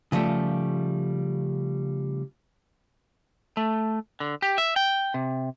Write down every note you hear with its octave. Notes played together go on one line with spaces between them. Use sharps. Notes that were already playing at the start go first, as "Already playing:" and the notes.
C#3 F3 G3 A3 G4
A3
D3
G4
E5
G5
C3